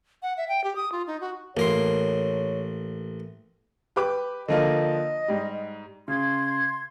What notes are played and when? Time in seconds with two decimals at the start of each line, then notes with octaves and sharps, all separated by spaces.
0.23 F#5
0.37 E5
0.49 G5
0.64 G4
0.76 D#6
0.92 F4
1.07 D#4
1.21 F#4
1.57 A1 A#3 A#4 C#5 C6
3.96 G4 B4 D6
4.48 D3 F3 A#3 D#5
5.28 G#2 G3
6.08 C#3 C6 G#6